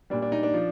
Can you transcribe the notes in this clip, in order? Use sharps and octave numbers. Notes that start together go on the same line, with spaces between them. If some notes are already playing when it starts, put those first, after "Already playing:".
A#2 G3 D4
D4
D#4
D4
F3